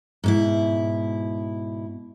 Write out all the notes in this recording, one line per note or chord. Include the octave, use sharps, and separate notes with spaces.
G#2 B2 E4